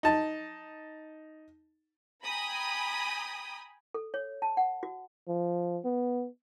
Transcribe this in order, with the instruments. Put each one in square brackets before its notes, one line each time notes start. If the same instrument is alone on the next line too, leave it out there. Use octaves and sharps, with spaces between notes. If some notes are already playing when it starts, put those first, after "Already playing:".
[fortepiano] D#4 A5
[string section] G5 G#5 A#5 B5 D#6
[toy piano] A4
C#5
A5
F#5
F#4
[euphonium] F3
B3